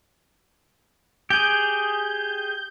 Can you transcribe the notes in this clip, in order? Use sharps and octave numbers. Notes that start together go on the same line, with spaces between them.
G4 G#4 G6